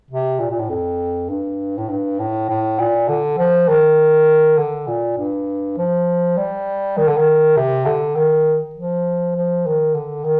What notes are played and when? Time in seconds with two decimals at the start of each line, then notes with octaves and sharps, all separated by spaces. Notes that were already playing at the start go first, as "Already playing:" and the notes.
0.10 C3
0.40 A#2
0.50 A#2
0.59 A2
0.69 F2
1.29 G2
1.77 A2
1.89 G2
2.19 A2
2.49 A2
2.79 A#2
3.09 D3
3.38 F3
3.68 D#3
4.57 D3
4.87 A#2
5.18 G2
5.77 F3
6.37 G3
6.97 D#3
7.07 D3
7.17 D#3
7.56 C3
7.85 D3
8.16 D#3
8.75 F3
9.35 F3
9.66 D#3
9.95 D3
10.24 D#3